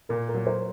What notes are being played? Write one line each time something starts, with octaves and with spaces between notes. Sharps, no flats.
A#2 A#4
A#4
F#3
C5